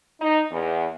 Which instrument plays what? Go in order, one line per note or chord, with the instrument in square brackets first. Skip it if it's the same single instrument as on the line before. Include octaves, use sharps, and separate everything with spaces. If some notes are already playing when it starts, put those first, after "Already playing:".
[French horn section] D#4
E2